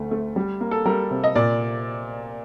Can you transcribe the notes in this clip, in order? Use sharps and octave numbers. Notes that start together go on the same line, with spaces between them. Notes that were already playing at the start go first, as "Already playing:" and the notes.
Already playing: D2 D3 A3
A3
G3
A#3
A4
G3 A#4
C3
D#5
A#2 D5